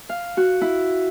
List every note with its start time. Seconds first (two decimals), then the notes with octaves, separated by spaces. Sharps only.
0.09 F5
0.37 F#4
0.61 E4